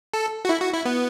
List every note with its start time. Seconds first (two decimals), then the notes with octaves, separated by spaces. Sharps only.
0.13 A4
0.45 F#4
0.49 E4
0.61 F#4
0.74 E4
0.85 B3